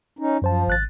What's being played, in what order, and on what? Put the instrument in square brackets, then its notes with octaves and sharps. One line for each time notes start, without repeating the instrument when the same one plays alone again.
[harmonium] C#4 D#4
[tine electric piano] F#2 C5 A5 [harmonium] F3
[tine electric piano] G#1 F#6 A6